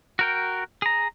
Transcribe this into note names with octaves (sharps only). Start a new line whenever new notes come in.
F#4 A#4 G5
G#4 A#5